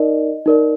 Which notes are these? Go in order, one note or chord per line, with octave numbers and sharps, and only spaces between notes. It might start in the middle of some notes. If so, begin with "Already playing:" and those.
Already playing: D#4 A#4 D5 D#5
D#4 A#4 D5